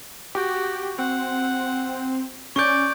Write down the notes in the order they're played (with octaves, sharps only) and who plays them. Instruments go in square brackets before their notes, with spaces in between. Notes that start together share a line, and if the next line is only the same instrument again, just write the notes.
[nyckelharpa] F#4 [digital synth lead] G4
[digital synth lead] C4 [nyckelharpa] F#5
[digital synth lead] C#4 [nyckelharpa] D5 [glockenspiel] C#6 G6